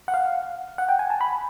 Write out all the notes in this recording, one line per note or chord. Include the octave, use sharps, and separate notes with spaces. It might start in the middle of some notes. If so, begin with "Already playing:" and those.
F#5
F5
F#5
G5
G#5
A5
B5